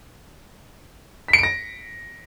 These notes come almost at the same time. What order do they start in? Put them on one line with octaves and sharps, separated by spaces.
B6 C#7 D7 A#6